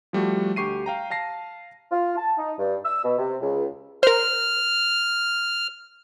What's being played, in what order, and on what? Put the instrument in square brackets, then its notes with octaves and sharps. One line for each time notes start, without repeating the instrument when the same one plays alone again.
[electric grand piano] F3 G3 A3 F#4
D2 G4 C#6 C7 D#7
F5 G5 A#5
F5 A5 A#6 C7
[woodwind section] F4
A5
D#4
G2
E6
B2
C3
C#2
[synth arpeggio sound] A#4 C5 [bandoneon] F6